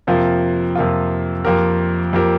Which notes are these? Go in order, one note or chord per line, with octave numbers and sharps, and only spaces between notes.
F2 C3 F3 A#3 F4
F2 C3 F3 A#3 F4
F2 F3 A#3 G4 A#4
F2 F3 A#3 G4 A#4